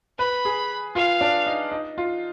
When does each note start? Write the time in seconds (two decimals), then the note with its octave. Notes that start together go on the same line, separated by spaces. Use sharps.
0.19 B4 B5
0.45 G#4
0.95 F4 F5
1.21 D4
1.46 D#4
1.72 D#4
1.98 F4